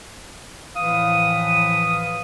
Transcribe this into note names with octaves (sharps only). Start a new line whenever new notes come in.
A2 E3 F3 B4 F5 D#6